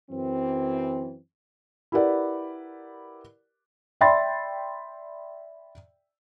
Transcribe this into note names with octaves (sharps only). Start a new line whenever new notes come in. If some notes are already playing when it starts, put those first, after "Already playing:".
F#2 E3 C4
E4 G4 A#4 B4 D5 F#5
D5 E5 G5 B5 C6 A6